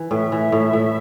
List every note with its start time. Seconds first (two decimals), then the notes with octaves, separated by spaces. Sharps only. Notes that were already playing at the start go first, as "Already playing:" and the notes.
Already playing: E3
0.11 A2 E5
0.32 E3
0.52 A2
0.73 A2